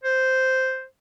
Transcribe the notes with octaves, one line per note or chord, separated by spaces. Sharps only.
C5